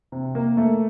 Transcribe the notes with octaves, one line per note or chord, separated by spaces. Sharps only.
C3
A#3
A3